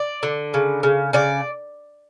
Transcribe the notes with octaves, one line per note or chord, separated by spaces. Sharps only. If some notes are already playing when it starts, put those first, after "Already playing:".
Already playing: D5
D3
C#3
C#3
C#3 D5